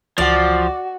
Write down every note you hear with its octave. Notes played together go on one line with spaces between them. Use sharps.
C#2 E3 F3 F#4 D5